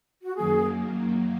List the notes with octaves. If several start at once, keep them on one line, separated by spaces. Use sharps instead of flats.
F#4
F#2 D#3 F#3 A#3 G#4